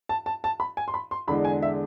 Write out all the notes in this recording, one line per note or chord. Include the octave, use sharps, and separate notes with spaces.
A5
A5
A5
B5
G#5
C6
B5
C6
E2 D3 G#3 D4 B5
G#5
E5